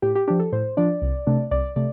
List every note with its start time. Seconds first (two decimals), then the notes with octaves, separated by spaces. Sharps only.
0.02 A2 G4
0.15 G4
0.28 F3 D4 G4
0.39 A4
0.52 A2 C5
0.77 F3 D4 D5
1.02 C2
1.27 C3 A3 D4
1.51 C2 D5
1.76 C3 A3 D5